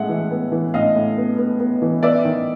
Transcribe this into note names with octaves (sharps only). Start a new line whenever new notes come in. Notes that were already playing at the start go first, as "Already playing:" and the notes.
Already playing: A2 G#3 E5 F#5
E3
B3
E3
A2 D#5 F5
A2
B3
B3
B3
E3
B3 D5 E5
D#3